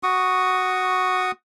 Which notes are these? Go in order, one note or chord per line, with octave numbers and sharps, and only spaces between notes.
F#4 C#6 D#6